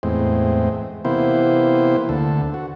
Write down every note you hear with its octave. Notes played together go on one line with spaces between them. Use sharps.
E2 A2 G#3 C4
C3 E3 A#3 B3 E4 C5
D2 D3 A4
F#4